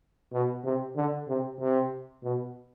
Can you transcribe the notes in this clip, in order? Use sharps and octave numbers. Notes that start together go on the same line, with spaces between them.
B2
C3
D3
C3
C3
B2